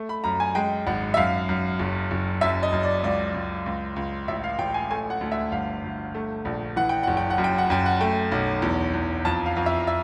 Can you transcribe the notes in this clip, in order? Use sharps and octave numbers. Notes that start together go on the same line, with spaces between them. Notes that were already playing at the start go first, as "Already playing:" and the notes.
Already playing: A3
B5
F#2 A#5
G#5
G#3 G5
G#1 F#5
E5
F#2 F5
F#2
F#1
F#1
F#2 E5
D#5
F#2
D5
C#2 D5
C#2
C#2
C#2
A1 E5
F5
A1 G5
G#5
A3 G#5
F#5
D2
E5
G1 F5
G1
A3
A#1
E3 F#5
G5
F#1 F#5
G5
F#5
F#2
G5
F#5
F#2 G5
F#5
A3 G5
B1
E2
E2
F2 A5
F5
F2
E5
E5